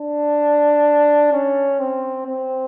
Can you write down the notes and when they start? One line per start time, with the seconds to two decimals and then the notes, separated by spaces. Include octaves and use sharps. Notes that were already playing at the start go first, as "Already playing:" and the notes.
Already playing: D4
1.33 C#4
1.80 C4
2.26 C4